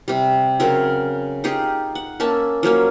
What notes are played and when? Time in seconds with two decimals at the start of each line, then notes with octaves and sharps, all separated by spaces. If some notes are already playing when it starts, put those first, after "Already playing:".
0.08 C3 G3
0.60 C#3 F#3 C4 A#4
1.44 D#4 F4 G4 G#4
1.95 F#5
2.20 A#3 C#4 E5 A5
2.63 F3 F#3 A#3 C#4